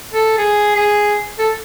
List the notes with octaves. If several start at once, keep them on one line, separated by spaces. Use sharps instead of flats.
A4
G#4
G#4
A4